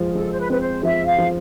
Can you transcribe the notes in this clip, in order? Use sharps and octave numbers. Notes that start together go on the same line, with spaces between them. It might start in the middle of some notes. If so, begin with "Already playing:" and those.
Already playing: F3 G#3
G#4
G#3 A4
C5
B4
C4 B4
C5
F3 E5
F5
F3